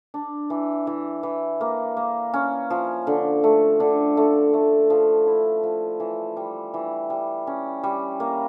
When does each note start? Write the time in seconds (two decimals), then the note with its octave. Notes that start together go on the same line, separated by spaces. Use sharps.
0.14 D4
0.50 E3
0.87 E3
1.23 E3
1.61 A#3
1.97 A#3
2.34 C#4
2.70 F3
3.07 D3
3.44 A3
3.80 D3
4.17 A3
4.54 A3
4.90 F3
5.27 E4
5.63 F3
6.00 E3
6.37 G3
6.74 E3
7.10 G3
7.47 C#4
7.84 G3
8.20 A#3